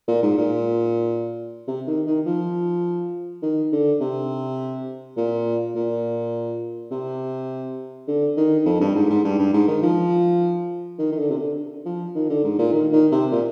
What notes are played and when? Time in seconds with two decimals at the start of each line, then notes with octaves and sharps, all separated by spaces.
0.08 A#2
0.23 G#2
0.37 A#2
1.68 C3
1.87 D#3
2.07 D#3
2.26 F3
3.42 D#3
3.72 D3
4.01 C3
5.17 A#2
5.75 A#2
6.91 C3
8.07 D3
8.37 D#3
8.66 F2
8.80 G2
8.95 G#2
9.10 G#2
9.24 G2
9.38 G2
9.53 G#2
9.67 D#3
9.82 F3
10.99 D#3
11.12 D#3
11.17 D3
11.30 C3
11.38 D3
11.86 F3
12.15 D#3
12.30 D3
12.44 G#2
12.58 A#2
12.73 D#3
12.92 D#3
13.12 C3
13.31 A#2